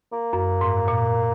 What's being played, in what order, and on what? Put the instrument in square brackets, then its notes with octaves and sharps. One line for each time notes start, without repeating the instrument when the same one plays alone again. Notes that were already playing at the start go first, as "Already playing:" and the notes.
[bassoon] A#3
[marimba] F#2
G#2
A#2